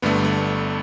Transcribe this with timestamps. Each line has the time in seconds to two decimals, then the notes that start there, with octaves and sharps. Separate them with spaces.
0.02 G1 G2 D3 A3 B3
0.25 A3